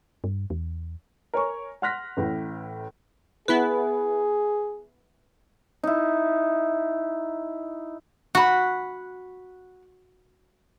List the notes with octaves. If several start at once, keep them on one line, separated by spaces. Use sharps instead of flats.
G2
E2
A#4 C#5 G#5 C#6
F#5 C6 F6 F#6 A#6 B6
A1 A2
B3 E4 G#4 B4
D#4 E4
F#4 F#5 B5